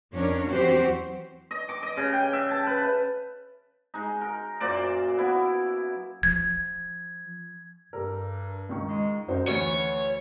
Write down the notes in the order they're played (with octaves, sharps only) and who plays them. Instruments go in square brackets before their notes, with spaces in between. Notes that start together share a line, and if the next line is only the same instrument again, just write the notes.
[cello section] F2 C#4 D4 A#4 C#5
E2 F#3 C4 F#4 G4 C5
[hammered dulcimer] D#5
D6
D#5
C#3
G5
E5
A5
B4
G#3 D#4
A#4
F#2 A#2 C5 D5
B3 E4
[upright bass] F3 [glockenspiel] G#6
[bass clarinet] G2 [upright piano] G3 A4 A#4
[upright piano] C#2 D#3 C#6
[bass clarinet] G#3
[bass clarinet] F#2 [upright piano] D#4 F#4 C5
[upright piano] D2 [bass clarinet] E3 [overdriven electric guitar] C#5